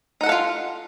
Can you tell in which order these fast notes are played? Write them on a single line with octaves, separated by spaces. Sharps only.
D#4 F#5 A4 F5 F4